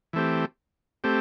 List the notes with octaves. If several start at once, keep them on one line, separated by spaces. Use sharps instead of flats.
E3 A3 C4 G4
A3 C4 G4